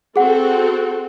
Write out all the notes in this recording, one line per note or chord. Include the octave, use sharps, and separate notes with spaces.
C4 F#4 G#4 A4 F#5